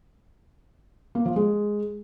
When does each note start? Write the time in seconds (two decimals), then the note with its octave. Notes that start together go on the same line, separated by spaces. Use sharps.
1.15 A#3
1.26 F3
1.36 G#3